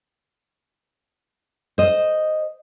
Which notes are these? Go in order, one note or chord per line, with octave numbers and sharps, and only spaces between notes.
C5 D#5